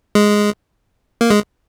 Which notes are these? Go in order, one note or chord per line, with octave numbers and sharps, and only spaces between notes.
G#3
A#3
G#3